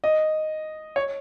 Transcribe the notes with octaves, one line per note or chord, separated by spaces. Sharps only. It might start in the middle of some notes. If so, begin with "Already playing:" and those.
D#5
C#5